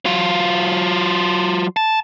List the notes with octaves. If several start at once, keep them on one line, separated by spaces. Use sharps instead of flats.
F#3 F4
A5